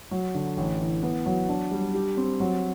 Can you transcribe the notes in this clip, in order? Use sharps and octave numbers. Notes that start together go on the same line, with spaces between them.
F#3
D3
A1
E3
B3
F#3
D4
G3
G4
C4
F#3